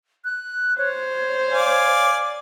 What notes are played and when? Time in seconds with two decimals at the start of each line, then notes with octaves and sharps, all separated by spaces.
0.25 F#6
0.78 C5 C#5
1.53 D5 F5 G#5